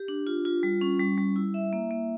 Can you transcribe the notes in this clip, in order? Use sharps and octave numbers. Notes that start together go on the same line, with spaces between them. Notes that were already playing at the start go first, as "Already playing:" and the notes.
Already playing: G4
D4
F4
F4
G3
C#4
G3
G3
E4
E5
A#3
A#3